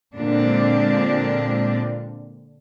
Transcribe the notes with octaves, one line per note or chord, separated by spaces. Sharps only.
A#2 D3 G#3 C4 D4 F4